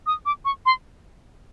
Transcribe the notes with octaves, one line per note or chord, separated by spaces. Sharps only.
D#6
D6
C#6
C6